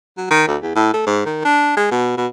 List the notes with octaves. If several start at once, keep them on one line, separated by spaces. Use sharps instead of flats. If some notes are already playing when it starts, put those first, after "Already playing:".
F#3
D#3
D2
E2
A2
A3
G#2
D#3
D4
G#3
B2
B2